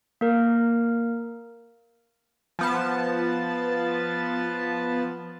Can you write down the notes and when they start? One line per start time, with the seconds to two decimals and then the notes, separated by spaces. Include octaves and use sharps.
0.21 A#3 A#4
2.59 F3 B3 A5